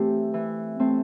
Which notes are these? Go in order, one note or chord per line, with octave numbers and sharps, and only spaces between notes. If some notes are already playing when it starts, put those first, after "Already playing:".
Already playing: E3 A3 C4 G4
E3
A3 C4